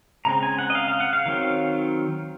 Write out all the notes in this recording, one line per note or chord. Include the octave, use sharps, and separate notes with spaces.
C#3 G#3 C4 A#5
G#5
F#5
D#5
F5
F5
F#5
F5
D#3 F#3 C4